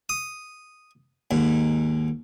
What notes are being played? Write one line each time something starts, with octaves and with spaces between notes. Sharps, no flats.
D#6
D#2 G#2